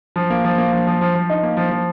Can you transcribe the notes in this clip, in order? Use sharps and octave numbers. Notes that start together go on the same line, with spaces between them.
F3
A#3
F3
A#3
F3
F3
F3
F3
D#4
A#3
F3
F3